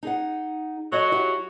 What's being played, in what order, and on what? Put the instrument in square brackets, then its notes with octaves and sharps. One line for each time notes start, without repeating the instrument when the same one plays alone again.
[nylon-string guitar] D#4 G#4 F#5
[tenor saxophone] F#3 [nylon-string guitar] A4 C#5 D#5
[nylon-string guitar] E4 F#4 G4